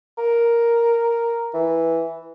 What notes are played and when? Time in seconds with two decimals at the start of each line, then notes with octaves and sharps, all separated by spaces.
0.18 A#4
1.54 E3